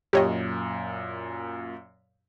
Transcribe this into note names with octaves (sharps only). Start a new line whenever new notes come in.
F#2 A#2 G4 C#5 D#5